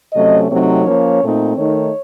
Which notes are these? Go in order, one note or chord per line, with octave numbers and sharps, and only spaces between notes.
C3 F#3 A3 C#4 D#5
C3 F#3 A3 C4 D#4 C#5
F3 A#3 C#4
A#2 A3 C4 D#4
D#3 A3 D#4 C#5